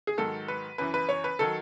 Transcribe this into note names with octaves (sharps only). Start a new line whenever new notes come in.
G#4
G#2 D#3 F#3 A4
B4
F#2 E3 B4
B4
C#5
B4
D#3 F#3 A4